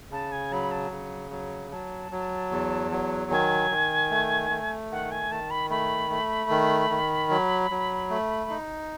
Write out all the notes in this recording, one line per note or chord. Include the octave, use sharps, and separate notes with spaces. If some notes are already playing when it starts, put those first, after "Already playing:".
C#3 A5
G#5
F#3 B5
A5
C#3
F#3
F#3 A5
F#3
E2
F#3
D#3 G#5
D#3
A3
A3
D#3 F#5
G#5
D#3 A5
B5
A3 B5
A3
D#3
D#3
F#3
F#3
A3
D#4